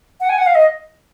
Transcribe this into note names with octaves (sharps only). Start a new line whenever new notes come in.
F#5
G#5
F#5
F5
D#5